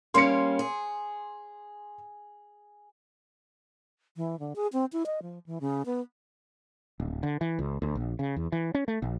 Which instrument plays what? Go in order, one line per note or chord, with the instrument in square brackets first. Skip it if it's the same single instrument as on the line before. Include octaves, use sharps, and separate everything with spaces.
[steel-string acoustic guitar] G3 A#3 C#4 [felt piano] C6 C#7
[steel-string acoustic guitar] G#4
[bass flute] E3
D3
G#4
C4
E4
D#5
F3
E3
C#3
B3
[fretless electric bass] D1
D3
E3
C#2
D2
A#1
C#3
E2
E3
C#4
A3
A#1